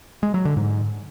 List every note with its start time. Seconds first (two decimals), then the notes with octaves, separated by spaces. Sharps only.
0.23 G#3
0.34 F#3
0.45 D3
0.57 G#2